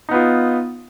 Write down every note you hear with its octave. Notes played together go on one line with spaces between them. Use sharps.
B3 D#4 F4